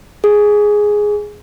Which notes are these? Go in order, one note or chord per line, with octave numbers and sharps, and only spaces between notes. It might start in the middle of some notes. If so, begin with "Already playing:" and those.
G#4